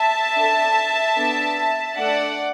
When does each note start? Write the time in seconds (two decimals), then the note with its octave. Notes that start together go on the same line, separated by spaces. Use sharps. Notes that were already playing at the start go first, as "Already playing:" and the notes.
Already playing: E5 A5
0.34 D4 A4
1.16 B3 D4 A4
1.97 A3 D4 A4 D5 F#5